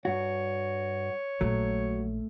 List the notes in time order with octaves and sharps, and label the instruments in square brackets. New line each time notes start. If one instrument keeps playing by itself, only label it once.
[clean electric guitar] G2 F#4 [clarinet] C#5
[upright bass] A#1 A#2 [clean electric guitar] F#3 [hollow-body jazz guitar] A3